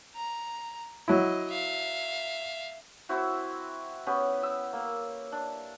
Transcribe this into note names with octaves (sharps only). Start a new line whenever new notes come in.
A#5
F#3 E4 D#5
E5 F5
C4 E4 F#4
B3 C#4 G4
E6
A#3
D4